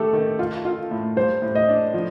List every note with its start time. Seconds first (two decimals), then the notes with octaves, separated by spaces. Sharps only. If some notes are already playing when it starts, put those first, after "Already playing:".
Already playing: D#3 A3 G4 A4
0.13 D#3
0.39 F4
0.65 F4
0.91 A2
1.17 G3 C5
1.42 A2
1.55 D#5
1.68 D4
1.94 F3